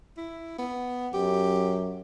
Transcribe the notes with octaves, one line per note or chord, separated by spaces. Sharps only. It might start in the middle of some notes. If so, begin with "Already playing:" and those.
E4
B3
F#2 G4